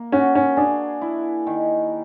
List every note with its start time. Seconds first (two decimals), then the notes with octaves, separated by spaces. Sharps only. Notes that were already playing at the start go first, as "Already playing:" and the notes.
Already playing: A#3
0.12 C#4 F#4
0.35 C#4
0.57 D4 G#4
1.02 E4
1.47 D#3